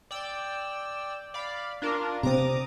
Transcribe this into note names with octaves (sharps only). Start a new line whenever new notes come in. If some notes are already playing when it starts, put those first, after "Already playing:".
D5 G5 E6
D5 F5 B5
D4 F4 A#4
C3 C4 A#5 D6 D#6